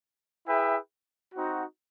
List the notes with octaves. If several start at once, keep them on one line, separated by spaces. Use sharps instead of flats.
E4 G#4 B4 E5 G5
C4 D#4 F#4